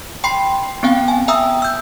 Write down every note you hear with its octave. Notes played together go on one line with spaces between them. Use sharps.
G5 B5 C6 C7
B3 C4 F5 G5
G#5
E5 G5 A#5 D#6 E6
E6 G6